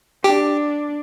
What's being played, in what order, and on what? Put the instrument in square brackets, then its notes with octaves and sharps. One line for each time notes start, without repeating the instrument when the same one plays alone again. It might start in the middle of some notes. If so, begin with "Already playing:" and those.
[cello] D4 [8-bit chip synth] G4